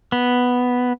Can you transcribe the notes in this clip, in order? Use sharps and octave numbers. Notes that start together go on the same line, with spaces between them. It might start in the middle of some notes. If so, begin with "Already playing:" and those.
B3